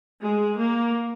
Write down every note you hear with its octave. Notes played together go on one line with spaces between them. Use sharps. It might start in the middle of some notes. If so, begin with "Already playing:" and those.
G#3
A#3